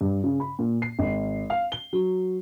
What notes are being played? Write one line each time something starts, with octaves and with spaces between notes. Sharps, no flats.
G2
C#3
B5
A#2
C7
G#1
F5
G7
F#3